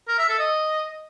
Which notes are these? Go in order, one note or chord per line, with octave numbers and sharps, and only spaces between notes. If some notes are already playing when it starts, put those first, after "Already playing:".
A#4
E5
A4
D#5